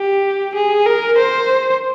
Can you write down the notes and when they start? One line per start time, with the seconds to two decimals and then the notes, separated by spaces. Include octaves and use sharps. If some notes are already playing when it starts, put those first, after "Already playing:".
Already playing: G4
0.55 G#4
0.86 A#4
1.18 C5